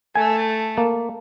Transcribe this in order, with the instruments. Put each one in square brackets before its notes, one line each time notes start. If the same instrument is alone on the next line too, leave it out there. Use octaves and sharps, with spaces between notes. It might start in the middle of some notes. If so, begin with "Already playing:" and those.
[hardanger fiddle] A3 [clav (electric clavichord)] G#5
[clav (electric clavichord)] A#3